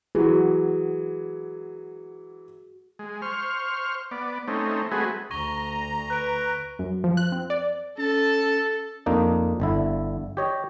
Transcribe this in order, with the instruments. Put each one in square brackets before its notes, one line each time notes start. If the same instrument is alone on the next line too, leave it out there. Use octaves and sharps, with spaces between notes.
[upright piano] E3 F#3 [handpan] F#4 G#4
[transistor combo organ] G#3
C5 C#6 F6
B3 D5
A3 C4 C#4 D#4
G#3 A3 C4 F#4 G#4 B4
[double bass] D2 [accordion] A#5 [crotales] C#6 A#6 G7
[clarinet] B4 [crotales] F#6 D7
[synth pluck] F#2
F3
F#6
C4
D5
[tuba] C#4 [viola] A4 [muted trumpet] A5
[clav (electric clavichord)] F2 A#3 D4 D#4
G1 D3 E4
G4 C#5 D#5